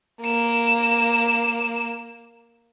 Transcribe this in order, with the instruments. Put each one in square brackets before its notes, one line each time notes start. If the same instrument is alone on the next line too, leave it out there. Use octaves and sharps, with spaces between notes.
[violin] A#3 E7